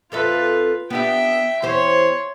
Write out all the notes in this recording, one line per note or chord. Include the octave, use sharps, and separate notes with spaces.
F2 F4 A4 B4 E5
B3 D4 G4 E5 G5
E2 G4 C5 C#5 C6